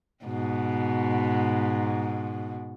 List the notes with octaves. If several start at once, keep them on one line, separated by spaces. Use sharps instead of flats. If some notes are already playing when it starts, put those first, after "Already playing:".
G#2 B2